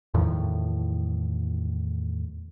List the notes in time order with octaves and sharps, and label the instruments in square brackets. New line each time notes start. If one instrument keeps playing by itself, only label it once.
[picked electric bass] E2 A2 D#3 F3